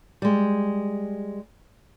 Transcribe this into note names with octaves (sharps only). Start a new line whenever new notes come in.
G3 G#3